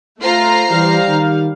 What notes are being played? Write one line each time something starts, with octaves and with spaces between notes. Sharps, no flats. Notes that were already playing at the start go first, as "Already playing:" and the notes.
A3 F4 C5 A#5 C7
E3 G3 F5
D#3